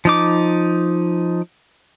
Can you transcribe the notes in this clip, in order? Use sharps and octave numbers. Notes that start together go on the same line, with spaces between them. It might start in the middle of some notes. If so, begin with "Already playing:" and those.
F3 D#4 D6